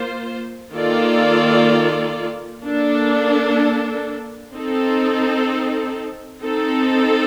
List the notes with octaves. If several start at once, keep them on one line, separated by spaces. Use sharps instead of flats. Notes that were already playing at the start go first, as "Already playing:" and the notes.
Already playing: A#3 F4 C5
D#3 A#3 F4 A4 D5
A#3 D4 A4
C4 D#4 A4
C4 D#4 A4